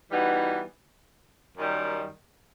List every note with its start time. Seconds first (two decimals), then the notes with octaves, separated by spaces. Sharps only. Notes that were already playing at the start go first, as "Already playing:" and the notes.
0.11 E3 G3 B3 D#4 F#4
1.56 F#2 D#3 G3